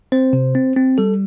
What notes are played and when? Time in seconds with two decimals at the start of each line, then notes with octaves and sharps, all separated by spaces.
0.12 C4 C5
0.33 C3
0.55 C4
0.76 C4
0.98 G3 A4